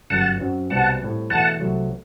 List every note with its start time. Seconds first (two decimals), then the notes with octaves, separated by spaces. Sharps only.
0.10 G1 F#2 F#3 F#5 A5
0.40 F#2 F#3 C4
0.70 C2 B2 G3 C4 F#5 A5
1.01 A2 G3 C4
1.30 E2 B2 A3 F#5 A5
1.60 C2 C3 F#3 A3